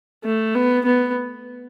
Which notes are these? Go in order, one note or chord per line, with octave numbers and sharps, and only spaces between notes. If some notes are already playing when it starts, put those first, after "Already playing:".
A3
B3
B3